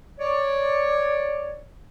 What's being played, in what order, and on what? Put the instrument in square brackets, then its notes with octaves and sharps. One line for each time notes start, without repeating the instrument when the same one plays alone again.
[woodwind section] C#5 D5